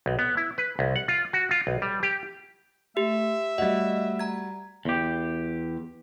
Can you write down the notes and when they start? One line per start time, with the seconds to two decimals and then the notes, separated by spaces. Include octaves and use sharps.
0.06 B1
0.19 B3
0.37 E4
0.58 B4
0.79 C2
0.96 F#5
1.08 F4
1.33 F#4
1.51 F4
1.67 B1
1.82 G3
2.03 G4
2.97 A3 G4 E5
3.58 G3 A3 F#4 D#5
4.19 A#5 G#6
4.85 E2 G4